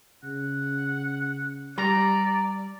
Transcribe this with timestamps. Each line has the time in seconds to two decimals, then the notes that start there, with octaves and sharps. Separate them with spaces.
0.23 C#3 F#5
1.78 G3 D5 A#5